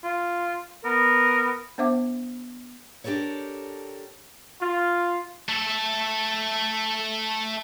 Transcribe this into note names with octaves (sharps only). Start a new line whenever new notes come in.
F4
B3 A#4
B3 D4 C5 E5 F#5 D6
D4 G4 A4 A#4 C#5
F4
A3 A4